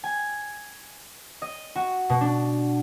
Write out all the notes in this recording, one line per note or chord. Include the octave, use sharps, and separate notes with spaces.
G#5
D#5
F#4
B2
D4